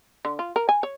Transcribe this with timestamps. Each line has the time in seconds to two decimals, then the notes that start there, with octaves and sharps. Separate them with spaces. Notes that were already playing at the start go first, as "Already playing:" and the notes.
0.25 D3
0.39 F4
0.56 A#4
0.69 G#5
0.83 C#5